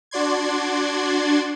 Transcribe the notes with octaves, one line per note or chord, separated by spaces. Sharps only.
D4 F#4 D5 C6 G#6